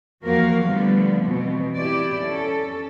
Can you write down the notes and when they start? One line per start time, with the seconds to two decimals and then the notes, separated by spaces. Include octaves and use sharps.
0.23 E2 F3 A#3 F#4 A#4 F5
0.63 D3 F3 G3 A3 B3
1.25 B2 E3 C4
1.77 E4 G4 D5
2.22 C#4 A4